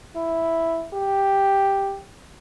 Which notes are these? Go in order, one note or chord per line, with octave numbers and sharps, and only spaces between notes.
E4
G4